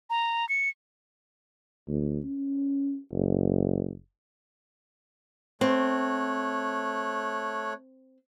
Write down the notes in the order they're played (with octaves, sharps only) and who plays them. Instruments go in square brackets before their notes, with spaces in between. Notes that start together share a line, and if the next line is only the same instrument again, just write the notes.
[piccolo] A#5
C#7
[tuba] D2
C#4
F#1
[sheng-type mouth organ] A3 C#5 F#6 [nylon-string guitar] C4